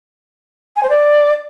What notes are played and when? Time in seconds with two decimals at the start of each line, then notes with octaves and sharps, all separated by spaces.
0.76 G#5
0.83 C5
0.89 D5